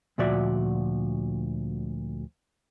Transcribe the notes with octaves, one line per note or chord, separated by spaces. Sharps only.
D2 A#2 F3 F#4 D5 E5